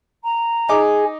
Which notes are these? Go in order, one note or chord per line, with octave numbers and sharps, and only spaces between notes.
A#5
D#4 G#4 D6